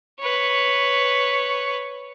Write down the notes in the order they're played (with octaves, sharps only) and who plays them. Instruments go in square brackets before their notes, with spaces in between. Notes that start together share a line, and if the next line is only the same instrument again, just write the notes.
[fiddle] B4 C#5